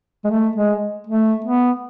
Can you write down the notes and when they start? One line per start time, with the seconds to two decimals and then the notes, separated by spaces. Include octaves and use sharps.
0.24 G#3
0.30 A3
0.56 G#3
1.07 A3
1.44 B3